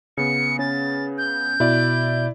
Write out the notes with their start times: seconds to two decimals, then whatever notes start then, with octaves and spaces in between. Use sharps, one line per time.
0.17 C#3 B3 C#7
0.59 C#4 A6
1.18 G6
1.60 B2 E4 D5